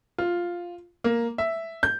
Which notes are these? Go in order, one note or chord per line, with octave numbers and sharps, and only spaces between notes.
F4
A#3
E5
G6